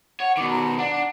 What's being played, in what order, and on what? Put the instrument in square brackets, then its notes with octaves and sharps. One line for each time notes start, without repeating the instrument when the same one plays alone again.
[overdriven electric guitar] C#5 [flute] F#5
[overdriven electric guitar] B2 D#3 [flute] D6
[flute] A#5
[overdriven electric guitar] D4 [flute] F#5